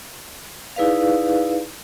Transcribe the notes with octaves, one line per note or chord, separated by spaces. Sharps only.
D#4 E4 G#4 B4 D5 F5